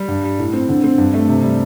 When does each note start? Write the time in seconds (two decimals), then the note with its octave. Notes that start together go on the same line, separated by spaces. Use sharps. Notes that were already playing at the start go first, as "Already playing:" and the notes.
Already playing: G3
0.08 G2
0.24 G3
0.39 A2
0.53 C4
0.69 D3
0.84 C4
0.98 G2
1.14 A3
1.28 C3
1.43 G3